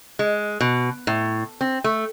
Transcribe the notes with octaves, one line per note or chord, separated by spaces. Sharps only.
G#3
B2
A2
C4
A3